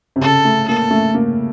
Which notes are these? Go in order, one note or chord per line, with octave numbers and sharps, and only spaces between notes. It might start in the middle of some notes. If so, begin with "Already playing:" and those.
C3
C#3 A4
A3
A#3 A4
A3
A#3